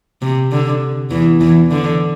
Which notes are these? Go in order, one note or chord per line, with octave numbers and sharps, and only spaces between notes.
C3
D3
E2 E3
E2 E3
D3